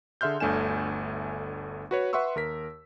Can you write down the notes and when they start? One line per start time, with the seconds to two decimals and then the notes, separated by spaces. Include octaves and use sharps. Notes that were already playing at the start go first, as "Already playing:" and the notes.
0.21 D3 G#4 E5 C6 F6 G6
0.40 G1 D2 A3 D4 G#5 E7
1.91 F#4 B4 C#5
2.13 B4 E5 F#5 C6 C#6 E6
2.36 D#2 A#4 B6